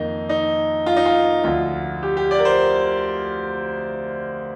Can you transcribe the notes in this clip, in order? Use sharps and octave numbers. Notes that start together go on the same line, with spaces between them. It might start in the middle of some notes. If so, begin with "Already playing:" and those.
Already playing: F2 D#3 A#3 D#4
D#4
F4
D#4
F4
D2 D3 F3 F4
G4
G4
D5
A#4
C5